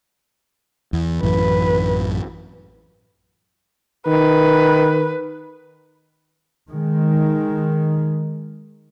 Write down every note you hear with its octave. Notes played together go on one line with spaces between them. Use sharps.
E2
A1 F#2 E3 B4
D#3 B4
D#3 G#3